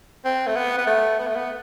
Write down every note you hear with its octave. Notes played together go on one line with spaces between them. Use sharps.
C4
A3
B3
B3
A3
B3
A3
B3